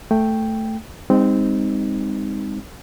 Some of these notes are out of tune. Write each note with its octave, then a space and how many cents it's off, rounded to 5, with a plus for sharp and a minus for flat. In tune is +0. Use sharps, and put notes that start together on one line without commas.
A3 +0 G5 +0
G#3 -45 C4 -10 D#4 +0